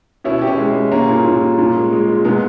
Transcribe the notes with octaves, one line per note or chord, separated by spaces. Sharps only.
B2 C#4 E4
B2 G4
C#4 E4
G#3
G#3
G3 A#3 C#4
A#2
A#2
G3
A#2
G#3
G#3
G#3
A#2 G#3 B3